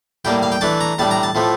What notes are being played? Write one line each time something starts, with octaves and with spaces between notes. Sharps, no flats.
A2 G3 A#3 G5
F5
G5
E3 A3 D4 A5
A#5
A2 G3 D4 A5
A#5
A5
A2 F3 A3